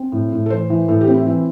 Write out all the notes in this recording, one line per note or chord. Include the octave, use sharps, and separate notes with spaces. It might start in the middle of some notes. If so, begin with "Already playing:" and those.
Already playing: C4
A2
A2
A4
E3 C5
E3
A2 A4
G4
C4
E4
E3